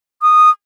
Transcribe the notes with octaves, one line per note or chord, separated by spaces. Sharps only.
D#6